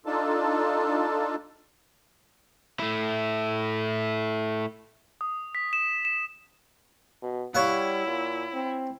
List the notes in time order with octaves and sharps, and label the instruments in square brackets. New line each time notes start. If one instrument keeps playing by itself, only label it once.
[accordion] D4 D#4 F4 A4 A5
[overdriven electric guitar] A3 E4
[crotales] D#6
B6
E7
E7
[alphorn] B2
[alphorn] G3 [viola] E4 [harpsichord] C#5 F5 F#5
[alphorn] A#2
C4